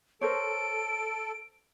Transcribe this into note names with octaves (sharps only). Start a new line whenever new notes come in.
A4 A#4 C5 C#5 D7